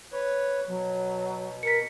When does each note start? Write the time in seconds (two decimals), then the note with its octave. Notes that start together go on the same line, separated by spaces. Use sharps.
0.12 B4 C#5
0.67 B2 F#3
1.63 A#4 B6 C#7